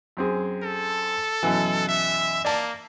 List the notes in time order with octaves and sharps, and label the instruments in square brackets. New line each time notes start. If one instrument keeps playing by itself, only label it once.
[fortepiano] F#2 C4 G#4
[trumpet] A4
[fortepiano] F#2 B2 E3
[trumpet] E5
[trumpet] A#3 [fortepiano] D5 A5